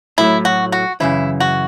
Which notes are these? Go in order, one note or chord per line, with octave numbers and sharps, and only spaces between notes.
A2 F#3 A3 E4
F#4
F#4
F#2 C#3 E3 E4
F#4